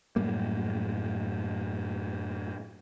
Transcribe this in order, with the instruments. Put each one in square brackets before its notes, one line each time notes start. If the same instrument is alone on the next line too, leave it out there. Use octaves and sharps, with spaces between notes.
[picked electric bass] F#2 A2 G3 A#3